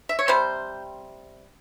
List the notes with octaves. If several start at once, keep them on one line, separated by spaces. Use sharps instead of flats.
E5
C#5
C3 G3 C5